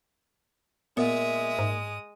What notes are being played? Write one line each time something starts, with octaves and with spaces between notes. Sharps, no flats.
A#2 G#3 B3 E5 D#6
G#2